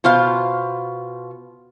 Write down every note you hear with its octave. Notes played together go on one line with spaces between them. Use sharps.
B2 F4 C5 F5